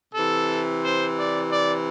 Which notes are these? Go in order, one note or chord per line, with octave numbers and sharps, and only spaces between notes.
C3 E3 A4
C5
D5
D5